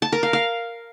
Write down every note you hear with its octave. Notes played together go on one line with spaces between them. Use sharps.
A5
A#4
F5
F5